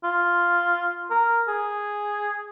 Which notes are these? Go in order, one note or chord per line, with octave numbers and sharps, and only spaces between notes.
F4
A#4
G#4